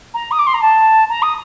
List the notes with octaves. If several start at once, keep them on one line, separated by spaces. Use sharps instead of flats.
A#5
D#6
D6
C6
A#5
A5
A#5
D#6